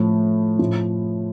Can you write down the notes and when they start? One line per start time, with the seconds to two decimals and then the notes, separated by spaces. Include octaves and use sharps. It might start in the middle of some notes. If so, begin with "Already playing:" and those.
Already playing: A2 F3
0.59 A2 F3